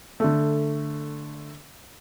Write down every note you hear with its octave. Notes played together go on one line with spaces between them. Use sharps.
D3 A3